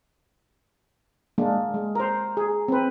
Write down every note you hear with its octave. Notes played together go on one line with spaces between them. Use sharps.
G#3 A#3 D4
G#3
A#4 C5 A#5
G#4
C4 B4